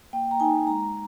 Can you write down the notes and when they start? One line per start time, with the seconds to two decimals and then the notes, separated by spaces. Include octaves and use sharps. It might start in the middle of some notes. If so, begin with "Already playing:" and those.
0.13 A#3 G5
0.31 A#5
0.40 D#4 G#5
0.67 G#3 A#5